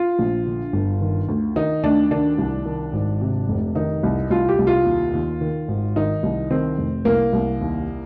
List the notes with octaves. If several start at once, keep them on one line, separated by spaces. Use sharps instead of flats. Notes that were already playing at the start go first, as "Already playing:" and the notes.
Already playing: F4
A#1
D3
G1
D#3
D2
D#3 D#4
D2 D4
D#3 D4
C2
D#3
G#1
C3
F1
D#3 D#4
C2
C2 F4
G4
C2
F4
D#2
D#2
D#3
G#1
D#3 D#4
C2
D#3 C4
F1
C2 A#3
C2
D#2